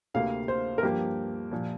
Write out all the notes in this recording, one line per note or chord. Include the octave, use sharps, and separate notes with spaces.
D2 C3 A#3 F5
C5
A#4
G2 F3 A#3 G4
A#2 F3